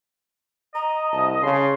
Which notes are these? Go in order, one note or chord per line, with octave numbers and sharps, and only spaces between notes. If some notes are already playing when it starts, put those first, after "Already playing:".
D#5 A#5
C2 A5
C#3 C6